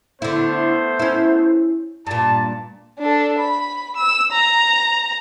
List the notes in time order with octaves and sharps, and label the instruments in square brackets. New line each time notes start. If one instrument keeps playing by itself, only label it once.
[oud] D3 E4 [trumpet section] A3 B3 C5
[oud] C#4 E4
[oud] G2 A#2 [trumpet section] D5 A5
[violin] D4 A4
B5
E6
A#5